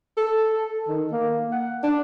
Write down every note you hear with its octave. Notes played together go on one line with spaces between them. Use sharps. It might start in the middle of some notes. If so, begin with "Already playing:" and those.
A4
D#3
A#3
F#5
D4